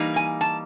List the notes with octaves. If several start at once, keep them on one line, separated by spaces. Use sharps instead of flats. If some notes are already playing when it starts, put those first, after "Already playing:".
Already playing: E3 G3 A#3 D#4
G#5
A5